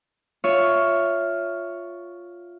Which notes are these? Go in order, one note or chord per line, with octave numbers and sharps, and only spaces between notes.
F4 C#5 E5